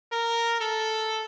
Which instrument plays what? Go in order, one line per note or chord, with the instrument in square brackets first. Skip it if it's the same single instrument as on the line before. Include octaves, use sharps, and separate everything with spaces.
[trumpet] A#4
A4